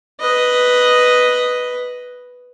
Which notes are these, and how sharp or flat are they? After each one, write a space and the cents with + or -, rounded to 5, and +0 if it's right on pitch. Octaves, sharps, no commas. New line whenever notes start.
B4 +0 D#5 +0